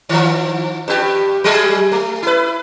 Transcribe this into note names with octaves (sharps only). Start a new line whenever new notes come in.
D#3 F3
G2 G4
F#3 G#3 G#4
A3
E4 B4